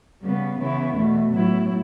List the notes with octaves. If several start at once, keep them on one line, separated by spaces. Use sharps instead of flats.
C#3 G3 B3
C#3 E3 B3 E4
E2 B2 A3
A2 F#3 B3 E4